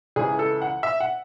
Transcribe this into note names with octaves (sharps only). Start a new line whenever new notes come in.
C#2 C#3 E3 G#4
A4
F#5
E5
F#5